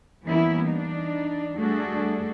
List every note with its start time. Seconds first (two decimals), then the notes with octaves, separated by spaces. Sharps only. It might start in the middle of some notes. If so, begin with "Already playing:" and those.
0.25 E3 G3 A#3 B3 C#4 E4
0.69 E3 D4 D#4
1.58 G3 A3 D4 F#4 G#4 A4